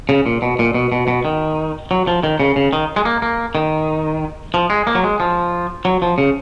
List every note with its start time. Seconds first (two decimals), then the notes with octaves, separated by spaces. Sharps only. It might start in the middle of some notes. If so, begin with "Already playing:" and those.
0.09 C#3
0.26 A#2
0.42 B2
0.59 A#2
0.74 B2
0.92 B2
1.08 B2
1.25 D#3
1.91 F#3
2.07 F3
2.23 D#3
2.40 C#3
2.56 C#3
2.73 D#3
2.96 G#3
3.05 A#3
3.22 A#3
3.55 D#3
4.54 F3
4.70 G#3
4.87 A#3
4.95 F#3
5.04 G#3
5.20 F3
5.85 F#3
6.02 F3
6.18 C#3